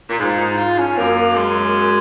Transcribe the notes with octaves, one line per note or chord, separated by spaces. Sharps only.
A#2
G#2 F4
D#4
F4
C#4
F#2 A#3
G#3